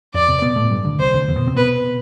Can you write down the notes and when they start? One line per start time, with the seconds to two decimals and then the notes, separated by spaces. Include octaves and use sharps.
0.14 F2 F3 D5
0.28 C3 C4
0.42 B2 B3
0.56 A2 A3
0.70 G2 G3
0.85 D2 D3
0.99 C2 C3 C5
1.14 D2 D3
1.28 E2 E3
1.37 B2 B3
1.46 C3 C4
1.56 B2 B3 B4